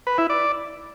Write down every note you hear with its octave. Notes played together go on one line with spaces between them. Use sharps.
B4
E4
D5